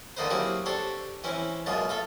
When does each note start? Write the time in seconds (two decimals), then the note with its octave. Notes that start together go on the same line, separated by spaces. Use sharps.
0.17 D3 D#3 A#3 D#4 B4 C5
0.31 F#3 A#3 C4 E4 G4 G#4
0.66 D4 G4 A4 C5 C#5
1.24 E3 C4 C#4 E4
1.66 F#2 B2 G#3 A#3 F4
1.89 F4 A4 E5